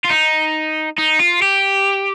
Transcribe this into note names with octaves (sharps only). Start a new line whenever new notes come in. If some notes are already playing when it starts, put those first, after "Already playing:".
F4
D#4
D#4
F4
G4